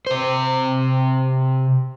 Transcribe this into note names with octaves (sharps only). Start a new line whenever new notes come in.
C3 C5